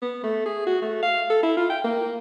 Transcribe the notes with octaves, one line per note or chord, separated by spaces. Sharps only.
B3
A3
G#4
F#4
A3
F5
A4
E4
F4
G5
A#3